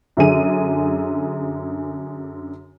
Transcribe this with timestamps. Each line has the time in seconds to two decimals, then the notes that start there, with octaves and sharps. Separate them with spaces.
0.17 F#2 D3 G#4 D#7